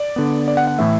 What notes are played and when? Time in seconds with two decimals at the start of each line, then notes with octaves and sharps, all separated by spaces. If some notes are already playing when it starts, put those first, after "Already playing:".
Already playing: D5
0.16 D3 B3
0.48 D5
0.57 F#5
0.67 F#5
0.78 A2 E3 A3 E5